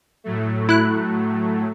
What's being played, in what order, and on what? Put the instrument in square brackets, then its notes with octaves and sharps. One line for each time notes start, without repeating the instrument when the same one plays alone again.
[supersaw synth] A2 F#3 A3
[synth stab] E4 F#6